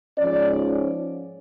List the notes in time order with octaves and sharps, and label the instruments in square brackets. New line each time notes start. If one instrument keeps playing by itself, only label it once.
[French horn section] G#2 F3 G#3 C#4 D5